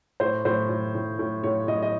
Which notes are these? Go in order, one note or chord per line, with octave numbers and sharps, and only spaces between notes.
A2 C5
A2 C5
A2
A2
A2
A2 C#5
A2 D#5
D#5